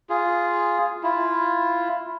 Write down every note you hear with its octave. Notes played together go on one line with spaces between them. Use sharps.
F4 G#4
E4 F4